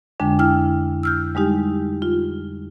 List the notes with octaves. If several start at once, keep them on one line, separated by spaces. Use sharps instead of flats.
F2 D3 G#3 D4 G5
E4 G5 F6
E6 F6 G6
G3 G#3 D#4 G4
F4